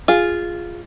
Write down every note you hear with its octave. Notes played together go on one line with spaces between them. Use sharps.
F4 G#4